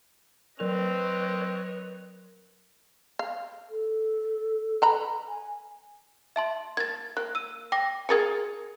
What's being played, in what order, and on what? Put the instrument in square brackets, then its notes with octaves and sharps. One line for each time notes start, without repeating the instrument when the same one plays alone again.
[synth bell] F#3 A#4 F7 [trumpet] C4 [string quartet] B4 C#5 D#5
[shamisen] F5
[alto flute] A4
[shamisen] B4 A#5 B5
[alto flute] G#5
[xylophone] E5 A5 C6
[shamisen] A#3 [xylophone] G#6 A6
[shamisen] A#3 [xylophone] F#6
[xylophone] E6 D#7
G5 D6 A#6
[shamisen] G#4 A#4 G#5 [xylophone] G#6 A6 C#7